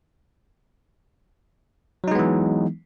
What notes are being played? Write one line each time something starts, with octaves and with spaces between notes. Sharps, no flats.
E3 F#3 G#3 B3 D#4